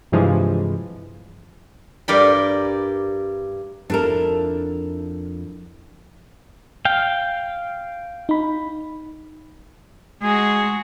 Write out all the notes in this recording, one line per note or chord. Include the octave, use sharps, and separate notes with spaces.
G2 C3 E3 F3 G#3
G2 A#4 D5 G5 B5
F2 F3 D4 E4 A4 A#4
F5 G5
D#4 B5
G#3 F#4 G#4